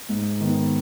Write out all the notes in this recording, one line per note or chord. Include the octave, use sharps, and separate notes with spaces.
G#2
D#3 B3